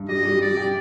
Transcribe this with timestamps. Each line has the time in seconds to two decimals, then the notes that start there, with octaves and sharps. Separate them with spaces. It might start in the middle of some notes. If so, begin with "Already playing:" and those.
Already playing: G2
0.08 G3 D#5
0.25 G3
0.41 G3 D5
0.57 G4